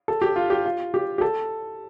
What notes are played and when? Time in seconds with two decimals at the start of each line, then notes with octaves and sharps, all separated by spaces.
0.08 A4
0.22 G4
0.36 F4
0.50 G4
0.66 F4
0.94 G4
1.18 G4
1.21 A4